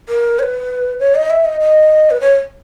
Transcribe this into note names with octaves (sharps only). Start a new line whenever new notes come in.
A#4
C#5
B4
C#5
D#5
E5
D#5
D#5
B4
C#5